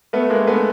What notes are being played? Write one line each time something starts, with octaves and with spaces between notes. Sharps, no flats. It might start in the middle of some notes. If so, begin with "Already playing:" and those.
A3 B3
G#3 A#3
A3 B3